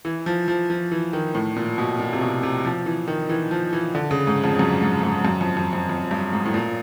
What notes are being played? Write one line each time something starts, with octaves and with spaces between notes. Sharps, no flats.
E3
F3
F3
F3
E3
D#3
A2
A#2
B2
A#2
C3
B2
C3
F3
E3
D#3
E3
F3
E3
D3
C#3
G#2
F2
F#2
G#2
G#2
F#2
F2
F2
F2
F2
G2
G#2
A2
A#2